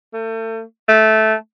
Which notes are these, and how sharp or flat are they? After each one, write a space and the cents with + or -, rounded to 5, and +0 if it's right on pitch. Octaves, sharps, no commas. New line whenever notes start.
A3 +35
A3 -10